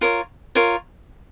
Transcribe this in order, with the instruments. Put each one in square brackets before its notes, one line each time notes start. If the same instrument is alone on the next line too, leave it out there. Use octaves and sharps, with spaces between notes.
[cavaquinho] F4 A#4 C#5
F4 A#4 C#5